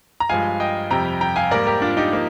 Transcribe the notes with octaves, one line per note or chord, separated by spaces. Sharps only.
A#5
G2 F3 G#3 F5 G#5
D#5 G5
F2 C3 G3 G5 A#5
G5 A#5
F5 G#5
G#2 G3 A#3 A#4 D5
G4 A#4
D4 F4
D#4 G4
F3 A#3